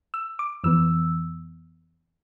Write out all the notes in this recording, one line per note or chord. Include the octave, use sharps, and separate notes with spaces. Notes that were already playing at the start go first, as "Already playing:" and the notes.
E6
D6
F2 E3 B3 E6